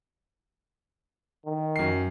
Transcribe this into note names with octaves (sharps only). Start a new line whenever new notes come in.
D#3
F#2 C7